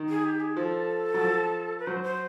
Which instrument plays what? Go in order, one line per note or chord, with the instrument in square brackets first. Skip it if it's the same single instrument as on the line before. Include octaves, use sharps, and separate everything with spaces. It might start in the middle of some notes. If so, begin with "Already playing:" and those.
Already playing: [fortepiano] D#3
[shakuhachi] G#4
G4
G#4
[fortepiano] F3 [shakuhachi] A4
[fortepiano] F#3
F3
[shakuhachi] B4
[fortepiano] F#3 [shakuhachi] C5
[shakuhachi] C5